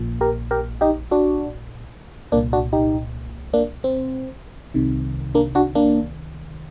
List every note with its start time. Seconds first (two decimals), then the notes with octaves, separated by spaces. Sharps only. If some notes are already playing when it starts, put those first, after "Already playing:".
Already playing: A#1 A#2
0.21 G4 A#4
0.51 G4 A#4
0.81 D#4 G4
1.11 D4 F#4
2.32 C2 A#2 A#3 D4
2.53 D4 F#4
2.73 D#4 G4
3.53 A#3 D4
3.84 C4
4.74 C2 C3 D#3
5.35 A#3 D4
5.55 D4 F#4
5.75 A#3 D4